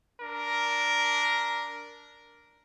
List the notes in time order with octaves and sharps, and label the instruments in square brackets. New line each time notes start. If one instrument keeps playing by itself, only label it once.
[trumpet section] D4 A#4